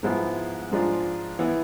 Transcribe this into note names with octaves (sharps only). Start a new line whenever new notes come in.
G#2 F3 G#3 B3 E4
G#2 F3 G#3 D4 F4
E3 B3 E4